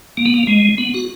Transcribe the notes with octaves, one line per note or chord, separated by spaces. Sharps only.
A#3
B3
A#3
G#3
B3
F#4